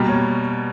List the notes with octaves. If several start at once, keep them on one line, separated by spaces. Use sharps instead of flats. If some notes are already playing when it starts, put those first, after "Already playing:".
Already playing: B2 G3 A#3
C#5